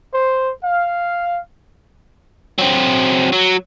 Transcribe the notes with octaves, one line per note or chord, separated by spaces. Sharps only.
C5
F5
F#3 C4
F#3